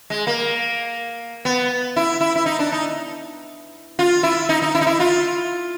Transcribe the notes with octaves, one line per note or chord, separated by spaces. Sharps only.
G#3
A#3
B3
E4
E4
E4
D#4
D4
D#4
F4
E4
D#4
D#4
E4
D#4
E4
F4